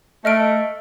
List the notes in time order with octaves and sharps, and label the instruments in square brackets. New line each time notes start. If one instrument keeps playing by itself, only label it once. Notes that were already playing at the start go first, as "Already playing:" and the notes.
[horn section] A3 [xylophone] D#5 F6 D7